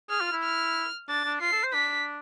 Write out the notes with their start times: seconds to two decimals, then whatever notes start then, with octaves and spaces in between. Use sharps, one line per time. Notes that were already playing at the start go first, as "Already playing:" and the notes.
0.10 G#4 F6
0.21 F4
0.32 E4
0.43 F6
1.09 D4 A6
1.25 D4
1.41 F4 C7
1.52 A4
1.63 C5
1.73 D4 B6